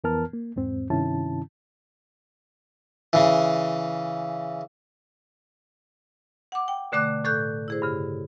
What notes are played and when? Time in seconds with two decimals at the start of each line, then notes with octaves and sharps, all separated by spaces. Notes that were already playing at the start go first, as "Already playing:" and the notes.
0.04 F2 E3 B3 A#4 A5 F6
0.33 A#3
0.56 E2 G#2 C4
0.90 G2 C3 D#3 C#4 E4 A5
3.13 C#3 E3
6.52 F#5 D6
6.68 G5
6.92 B2 D3 A3 D6 F#6
7.24 A2 A4 F#6 G6
7.68 E4 G#4 C5
7.82 G2 C#3